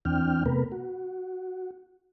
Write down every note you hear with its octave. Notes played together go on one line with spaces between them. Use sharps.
E2 E3 C4 D4 G5 F6
C3 A3 B3 A#4 B4
F#4